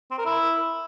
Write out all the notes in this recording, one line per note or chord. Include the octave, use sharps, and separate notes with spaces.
C4
A#4
E4